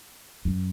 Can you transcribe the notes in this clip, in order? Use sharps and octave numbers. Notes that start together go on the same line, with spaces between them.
F#2